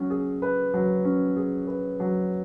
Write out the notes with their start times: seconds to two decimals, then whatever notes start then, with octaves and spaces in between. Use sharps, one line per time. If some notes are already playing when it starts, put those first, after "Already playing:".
Already playing: F#3 C#4
0.10 G#4
0.42 B4
0.74 F#3
1.04 C#4
1.36 G#4
1.67 B4
2.00 F#3